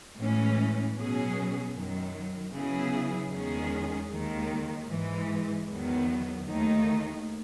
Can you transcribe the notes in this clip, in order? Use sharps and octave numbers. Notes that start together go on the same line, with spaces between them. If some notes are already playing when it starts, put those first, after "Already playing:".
A2 E3 G#3 C#4
B2 F#3 C#4 G#4
F#2 D#3 F#3
C#3 F#3 B3 E4 G#4
E2 D#3 G#3 C#4 G#4
D#2 D#3 G#3
G#2 E3 G#3
E2 D#3 F#3 B3
D#2 D#3 A3 D#4